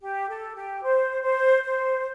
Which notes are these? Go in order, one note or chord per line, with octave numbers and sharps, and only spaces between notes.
G4
A4
G4
C5
C5
C5